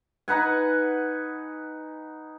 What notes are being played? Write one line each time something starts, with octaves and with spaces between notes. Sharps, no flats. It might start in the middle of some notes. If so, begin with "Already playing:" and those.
D#4 B4 F#5 G#5